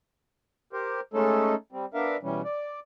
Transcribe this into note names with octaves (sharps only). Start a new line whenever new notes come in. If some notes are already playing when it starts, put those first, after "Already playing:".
G4 A#4 C5
G#3 A3 C#4 D#4 A4
G3 C4
B3 D4 A#4 E5 F5
B2 E3 G3 C#4
D5